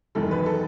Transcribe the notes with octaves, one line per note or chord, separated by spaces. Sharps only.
E1 E2 D#3 F#3 A4
B4
A4